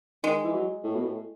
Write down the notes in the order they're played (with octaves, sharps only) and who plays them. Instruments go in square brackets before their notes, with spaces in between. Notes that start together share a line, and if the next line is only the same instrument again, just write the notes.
[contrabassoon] D#3 [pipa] G#3
[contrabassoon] E3
F#3
A2
B2
A2